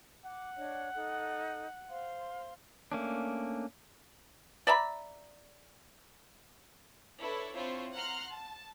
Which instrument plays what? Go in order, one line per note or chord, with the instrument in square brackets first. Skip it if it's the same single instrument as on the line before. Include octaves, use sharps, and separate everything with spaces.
[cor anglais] F#5 [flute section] D6
[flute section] D4 C#5 D#5
D#4 A4
C5 F5 C6
[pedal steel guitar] A3 A#3 C#4 D4
[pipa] D5 E5 A#5 B5
[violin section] D4 E4 A4 B4 C#5
C4 D4 E4 F4 C5 C#5
F#5 A#5 C6 F6 F#6
A5